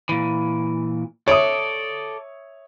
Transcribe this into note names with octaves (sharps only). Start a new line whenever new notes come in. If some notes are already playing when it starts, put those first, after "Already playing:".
A#2 E3
A4 C#5 D5 E5 D#6